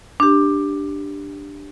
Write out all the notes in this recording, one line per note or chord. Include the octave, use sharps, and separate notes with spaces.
D4 G4